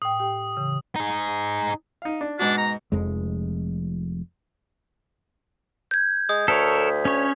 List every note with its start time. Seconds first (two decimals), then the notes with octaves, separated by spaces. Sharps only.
0.02 A2 G5 D#6
0.20 G4 G5
0.57 C#3 E3
0.96 D#4 G#4
2.02 D#4 F5
2.21 D4
2.39 G#2 B2 D4 F#4
2.58 A#5
2.92 F1 F2 G#3
5.91 G6 G#6
6.29 G#3 D#6
6.48 D2 A4 A#4 C#5 B6
7.05 C#4 C#5